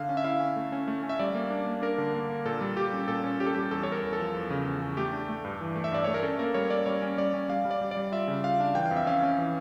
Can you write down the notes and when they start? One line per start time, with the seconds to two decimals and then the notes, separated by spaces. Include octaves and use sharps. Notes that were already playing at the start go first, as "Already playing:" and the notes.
Already playing: D3 F5
0.09 C#4
0.17 E5
0.24 E4 F5
0.40 C#4
0.56 A3
0.72 C#4
0.88 A3
1.03 C#4
1.09 E5
1.19 G3 D5
1.35 A#3
1.50 D4
1.67 A#3
1.82 D4 A#4
1.98 D3
2.14 A#3
2.30 A#3
2.45 A#2 A4
2.61 G3
2.77 G3 G4
2.93 C#4
3.08 A#2 A4
3.24 C#4
3.40 C#4 G4
3.46 A4
3.55 G3 G4
3.71 E2 A4
3.83 C#5
3.88 E2 A#4
4.02 E2
4.13 A4
4.19 F3
4.34 E2
4.50 C#3
4.66 E2
4.82 E2
4.97 A3 G4
5.13 D4
5.29 A3
5.45 G2
5.61 E3
5.76 A3
5.84 E5
5.92 G2 D5
6.04 A3 C#5
6.14 A#4
6.23 C#4 A4
6.39 A#3 A#4
6.54 G3 C#5
6.70 C#4 D5
6.86 G3 C#5
7.02 C#4
7.17 G3 D5
7.34 C#4
7.49 G3 F5
7.65 G3
7.71 D5
7.81 G3
7.91 D5
7.97 G3
8.12 F4 E5
8.28 C#3
8.44 F4 F5
8.60 D4
8.75 E3 G5
8.86 F5
8.91 F2
8.97 E5
9.07 C#4 F5
9.23 C#4
9.38 E3